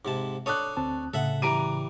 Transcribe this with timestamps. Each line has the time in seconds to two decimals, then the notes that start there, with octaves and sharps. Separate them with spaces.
0.05 G#2 C3 A5
0.46 D4 A4 C#5 D#6 F#6
0.77 D2 C4 A5
1.14 A2 C#3 A4 E5 F#5
1.42 E3 G3 A#5 D7 D#7